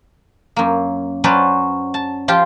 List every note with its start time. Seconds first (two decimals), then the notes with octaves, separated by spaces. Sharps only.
0.56 F#2 A#3
1.24 F#3 C#4 B4 C5 D5
1.94 A5
2.28 F3 F4 G4 G5 C6